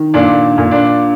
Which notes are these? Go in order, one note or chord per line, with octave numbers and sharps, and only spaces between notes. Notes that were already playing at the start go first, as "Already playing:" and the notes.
Already playing: D#3
A#2 D4 D5
A#2
D4 D5